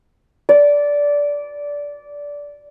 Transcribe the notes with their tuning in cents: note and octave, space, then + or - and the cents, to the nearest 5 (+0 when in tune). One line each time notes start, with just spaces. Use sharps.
D5 -15